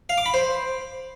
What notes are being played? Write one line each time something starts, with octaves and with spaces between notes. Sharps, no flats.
F5
D6
B5
C5